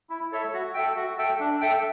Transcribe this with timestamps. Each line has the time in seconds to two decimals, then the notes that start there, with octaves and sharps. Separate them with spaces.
0.10 E4
0.32 A4 C#5 E5
0.53 F#4
0.74 A4 E5 G5
0.96 F#4
1.18 A4 E5 G5
1.40 D4
1.61 A4 E5 G5